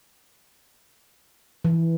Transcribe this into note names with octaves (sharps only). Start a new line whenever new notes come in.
E3